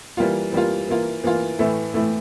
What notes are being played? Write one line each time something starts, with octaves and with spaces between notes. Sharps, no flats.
E3 G3 A#3 F4
E3 G3 A#3 F4
E3 A#3 F4
E3 A#3 F4
A2 E3 A3 E4
A2 E3 A3 E4